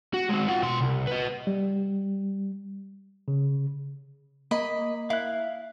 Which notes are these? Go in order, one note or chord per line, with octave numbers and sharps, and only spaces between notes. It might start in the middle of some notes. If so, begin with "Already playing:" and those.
F#4
G#3 C4
F4 F#5
B2 C6
C2
B4 D#5
G3
C#3
A#3 D#5 B5
E4 F5 F#6